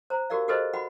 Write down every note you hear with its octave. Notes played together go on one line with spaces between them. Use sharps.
C5 A#5
F#4 G4 A#4 D5 F5
F#4 G4 A4 B4 C5 D#5
F#4 F#5 B5